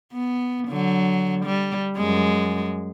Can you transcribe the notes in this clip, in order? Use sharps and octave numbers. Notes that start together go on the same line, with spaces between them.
B3
D3 F#3
G3
F#2 G#3